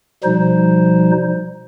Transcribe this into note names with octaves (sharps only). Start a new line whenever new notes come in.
B2 F3 G3 D#4 C5